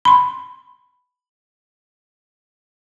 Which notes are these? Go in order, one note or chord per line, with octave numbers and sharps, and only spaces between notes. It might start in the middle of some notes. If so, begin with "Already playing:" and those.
B5 C6